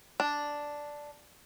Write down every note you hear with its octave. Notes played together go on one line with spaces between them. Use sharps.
D4